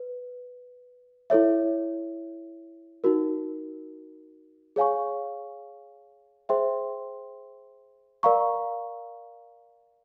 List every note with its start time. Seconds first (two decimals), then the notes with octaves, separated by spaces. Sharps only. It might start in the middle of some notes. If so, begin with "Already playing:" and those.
Already playing: B4
1.30 E4 A4 C#5 E5
3.04 D#4 F#4 A#4
4.76 G#4 C#5 F5 G#5 C#6
6.49 G#4 C5 E5 G5 C6
8.23 A#4 D5 F5 A#5 C#6